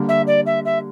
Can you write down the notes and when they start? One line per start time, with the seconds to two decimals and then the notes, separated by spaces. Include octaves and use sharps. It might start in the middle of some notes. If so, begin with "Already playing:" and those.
Already playing: D3 G3 A#3
0.08 E5
0.27 D5
0.46 E5
0.65 E5